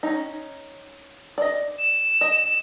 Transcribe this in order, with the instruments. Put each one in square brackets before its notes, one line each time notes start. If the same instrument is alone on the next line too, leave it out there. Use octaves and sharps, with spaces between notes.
[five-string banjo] C#4 D#4
D5 D#5
[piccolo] E7
[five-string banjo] D#5